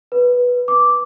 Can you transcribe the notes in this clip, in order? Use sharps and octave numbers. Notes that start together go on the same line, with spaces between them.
B4
D6